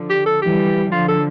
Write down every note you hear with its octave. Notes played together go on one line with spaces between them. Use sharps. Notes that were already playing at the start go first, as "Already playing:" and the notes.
Already playing: D3 F3
G4
A4
E3 G3 G4
D3 F3 F4
A4